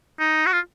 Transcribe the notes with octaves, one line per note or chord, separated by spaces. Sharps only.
D#4
F#4
F4